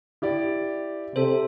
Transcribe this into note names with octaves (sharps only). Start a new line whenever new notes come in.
E4 G4 D5
C3 A4 C5